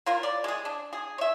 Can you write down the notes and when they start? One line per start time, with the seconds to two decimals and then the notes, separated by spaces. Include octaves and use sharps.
0.06 A#3 F4 A#4
0.23 D5
0.44 G#3 G#4
0.65 D4
0.93 G#4
1.18 C#5 E5